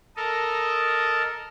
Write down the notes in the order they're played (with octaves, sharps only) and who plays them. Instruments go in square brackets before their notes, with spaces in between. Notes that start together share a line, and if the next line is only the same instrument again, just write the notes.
[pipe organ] A4 A#4 D#5